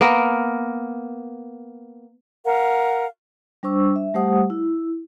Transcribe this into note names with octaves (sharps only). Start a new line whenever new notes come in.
A#3 B3 A#4
A#4 F5 F#5
G3 D4 C5 C#6 E6
E5
G3 A3 G4 C5 F#5 D#6
E4